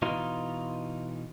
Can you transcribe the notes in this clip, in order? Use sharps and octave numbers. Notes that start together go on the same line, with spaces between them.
B2 E3 D#4 F4